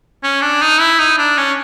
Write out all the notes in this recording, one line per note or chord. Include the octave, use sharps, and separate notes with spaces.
C#4
D4
D#4
E4
D#4
D4
C#4